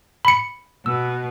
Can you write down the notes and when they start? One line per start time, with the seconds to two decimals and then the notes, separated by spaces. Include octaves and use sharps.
0.25 B5 C#7
0.86 B2 E6